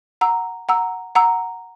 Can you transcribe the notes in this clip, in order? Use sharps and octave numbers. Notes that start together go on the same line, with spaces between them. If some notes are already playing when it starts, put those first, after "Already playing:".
F#5 A#5 E6
F#5 A#5 E6
F#5 A#5 E6